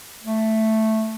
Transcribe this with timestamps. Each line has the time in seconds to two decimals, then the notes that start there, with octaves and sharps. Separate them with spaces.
0.24 A3